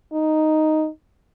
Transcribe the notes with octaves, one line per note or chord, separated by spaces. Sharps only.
D#4